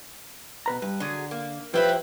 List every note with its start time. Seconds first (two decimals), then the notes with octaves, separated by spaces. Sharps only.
0.66 B2 B4 A#5
0.82 G2 B4
1.00 D3 F#3 G#4
1.31 A#3
1.74 F3 E4 G4 B4 C5 E5